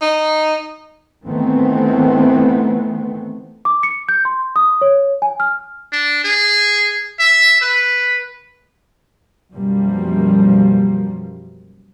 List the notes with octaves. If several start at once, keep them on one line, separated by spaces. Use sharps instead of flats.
D#4
D#3 E3 A3 B3 C4
D6
C#7
G6
C6
D#6
C#5
G#5
F6
D4
G#4
E5
B4
F#2 B2 F3 G3 A#3